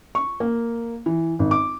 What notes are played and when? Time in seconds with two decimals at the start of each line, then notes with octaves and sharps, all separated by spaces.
0.15 C#6
0.40 A#3
1.06 E3
1.39 G#1
1.51 D6